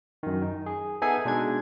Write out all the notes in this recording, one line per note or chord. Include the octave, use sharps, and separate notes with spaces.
F#2 D#3
D#4
G#4
B3 D#4 G#4 A4 E5 G#5
B2 G#3 D4 D#4 G#6